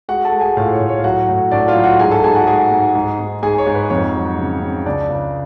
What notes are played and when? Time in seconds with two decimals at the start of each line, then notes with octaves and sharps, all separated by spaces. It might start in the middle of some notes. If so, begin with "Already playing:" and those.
0.09 G#3 F#4 F#5
0.25 A4 A5
0.32 G#3
0.41 G#4 G#5
0.57 A2 F4 F5
0.73 C#5
0.81 A2
0.89 C#5
0.99 F5
1.04 F#3 F#4 F#5
1.29 A2
1.51 A2 D4 D5
1.68 F4 F5
1.76 F#3
1.84 F#4 F#5
2.00 G#2 G#4 G#5
2.11 A4 A5
2.24 G#2 G#4 G#5
2.35 F#4 F#5
2.47 G#3 G#4 G#5
2.72 G#2
2.95 G#2
3.19 G#2
3.43 G#2 G#4 G#5
3.58 C#5
3.66 G#2
3.75 B4
3.90 F2 C#5
4.15 F#3
4.38 C#3
4.62 C#3
4.86 C#2 D4 D5
5.10 C#2